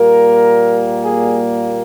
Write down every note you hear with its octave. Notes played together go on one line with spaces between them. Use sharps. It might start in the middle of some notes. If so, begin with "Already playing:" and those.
Already playing: A#2 G3 A#3 A#4
G#4